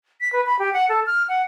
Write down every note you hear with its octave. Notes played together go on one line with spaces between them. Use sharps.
B6
B4
B5
G4
F#5
A4
F6
F#5